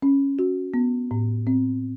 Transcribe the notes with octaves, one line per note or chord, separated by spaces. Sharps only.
C#4
F#4
B3
A2
C4